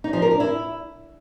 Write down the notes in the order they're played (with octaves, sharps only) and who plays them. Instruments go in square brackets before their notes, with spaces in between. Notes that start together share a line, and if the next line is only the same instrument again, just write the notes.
[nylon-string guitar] D#4
F3
A#4
D4
E4